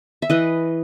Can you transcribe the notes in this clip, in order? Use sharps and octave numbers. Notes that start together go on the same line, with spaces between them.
E5
E3 B4 D#5